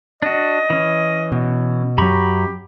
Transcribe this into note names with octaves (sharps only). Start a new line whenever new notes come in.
D4 F#4 D#5
E3 C#4
B2
F#2 F#3 G4 A#5 B5 C#6